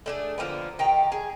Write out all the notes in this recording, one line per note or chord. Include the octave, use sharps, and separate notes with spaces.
A3 D4 G#4
D3 F3 A#3 B3
D#3 G4 A#5
G#4